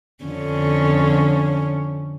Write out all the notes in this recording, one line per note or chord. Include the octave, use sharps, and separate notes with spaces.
F2 D3 C#4